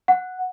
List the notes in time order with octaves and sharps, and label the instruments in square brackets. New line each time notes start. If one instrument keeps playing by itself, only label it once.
[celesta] F#5